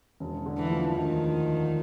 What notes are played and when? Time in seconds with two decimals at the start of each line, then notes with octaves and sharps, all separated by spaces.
0.20 E1
0.46 D3
0.58 E3
0.71 F3
0.96 D2 D#3